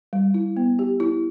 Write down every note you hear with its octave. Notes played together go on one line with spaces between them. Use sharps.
G3
E4
B3
G4
E4